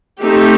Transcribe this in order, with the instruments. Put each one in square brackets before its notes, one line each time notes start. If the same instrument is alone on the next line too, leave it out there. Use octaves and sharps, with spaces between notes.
[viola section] A3 C4 D#4 G4